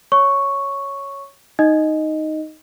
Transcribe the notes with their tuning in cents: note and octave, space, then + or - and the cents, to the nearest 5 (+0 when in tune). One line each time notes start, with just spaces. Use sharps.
C#5 +0 C#6 +0
D#4 +0 D#5 +0